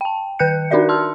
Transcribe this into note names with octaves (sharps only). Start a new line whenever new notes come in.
G5 A5
D#3 B4 G5 F#6 G6 C#7
D4 D#4 F#4 A#4 D5 E5
A5 C6 E6 F6